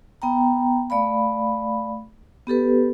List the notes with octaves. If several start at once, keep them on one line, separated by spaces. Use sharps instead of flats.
B3 G5 A#5
A3 D5 F5 B5
B3 G4 A4 B4